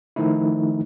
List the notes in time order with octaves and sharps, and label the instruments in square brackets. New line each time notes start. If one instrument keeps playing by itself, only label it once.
[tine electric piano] D#3 F3 A3 D#4 E4